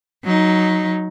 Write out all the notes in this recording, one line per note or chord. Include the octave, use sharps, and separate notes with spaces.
F#3 D#4